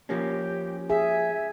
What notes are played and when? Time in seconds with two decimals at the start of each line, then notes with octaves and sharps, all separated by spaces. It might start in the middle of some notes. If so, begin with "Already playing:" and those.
0.09 F3 A#3 C#4 G4
0.90 G#4 E5